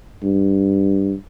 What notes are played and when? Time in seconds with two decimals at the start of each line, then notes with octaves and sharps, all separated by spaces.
0.23 G2